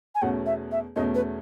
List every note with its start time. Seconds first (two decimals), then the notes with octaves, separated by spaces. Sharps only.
0.15 G#5
0.22 E2 B2 A3 C#4 F#5
0.46 E5
0.71 E5
0.96 E2 B2 A3 C#4 D#5
1.15 B4